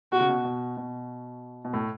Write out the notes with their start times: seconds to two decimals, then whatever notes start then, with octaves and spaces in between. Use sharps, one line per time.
0.12 B2 F#4
0.21 C#3
0.29 B2
0.45 B2
0.77 B2
1.65 B2
1.73 A2